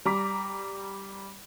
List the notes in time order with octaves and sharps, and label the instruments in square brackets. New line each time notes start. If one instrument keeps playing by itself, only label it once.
[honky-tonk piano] G3 A#5 D6 B6